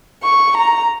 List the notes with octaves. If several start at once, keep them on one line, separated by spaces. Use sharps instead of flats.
C#6
A#5